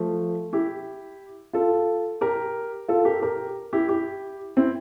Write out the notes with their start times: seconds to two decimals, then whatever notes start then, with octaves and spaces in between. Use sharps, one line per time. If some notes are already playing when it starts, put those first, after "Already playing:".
Already playing: F3 A3
0.53 E4 G4
1.53 F4 A4
2.21 G4 A#4
2.88 F4 A4
3.05 G4 A#4
3.22 G4 A#4
3.73 E4 G4
3.89 E4 G4
4.57 C4 E4